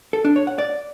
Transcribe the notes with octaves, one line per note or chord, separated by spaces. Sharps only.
A4
D4
C#5
F#5
D5